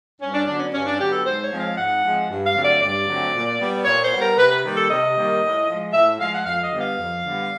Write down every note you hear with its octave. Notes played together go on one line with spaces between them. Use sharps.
G2 C#4
D4
D3 F#3 B3 D4
C#4
G2 C#4
D4
D3 F#3 B3 G4
A4
G#2 C5
C#5
F3 G#3 C4
F5
G#2 F#5
F3 G#3 C4
G2
F5
D3 F#3 A3 C4
D5
G2 D5
D3 F#3 A3 C4
A#2
G3 B3
A#2 C#5
C5
G3 B3
A#4
C3 B4
B4
D#3 G3 A#3
A4
C3 D#5
D#3 G3 A#3
A2
F3 G#3
A2 E5
F3 G#3 F5
F#5
F2 F5
D#5
D3 G3 B3
F5
F2
D3 G3 B3